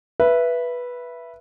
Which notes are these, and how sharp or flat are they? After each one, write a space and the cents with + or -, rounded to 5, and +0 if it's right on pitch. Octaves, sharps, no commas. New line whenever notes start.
B4 -10 E5 +15